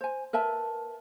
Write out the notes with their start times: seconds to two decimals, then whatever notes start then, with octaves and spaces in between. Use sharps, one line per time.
0.01 C5 G#5
0.33 A#4 B4 E5 A5